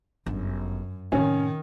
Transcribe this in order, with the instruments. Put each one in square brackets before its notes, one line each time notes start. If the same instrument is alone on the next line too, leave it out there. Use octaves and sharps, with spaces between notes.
[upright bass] G1 [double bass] F#2
[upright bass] A2 C3 [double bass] D#3 [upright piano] C#4